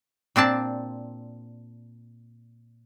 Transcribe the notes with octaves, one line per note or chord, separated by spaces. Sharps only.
A#2 C4 D4 A5